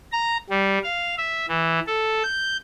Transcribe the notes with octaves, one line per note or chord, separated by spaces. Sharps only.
A#5
G3
F5
E5
E3
A4
G6